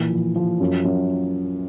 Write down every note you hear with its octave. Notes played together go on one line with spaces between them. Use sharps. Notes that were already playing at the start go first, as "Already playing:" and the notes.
Already playing: A#2 E3
F3
F3
F#2
F#2